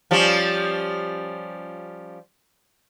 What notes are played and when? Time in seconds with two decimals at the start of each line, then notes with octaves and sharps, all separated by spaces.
0.11 F3 G3 C#4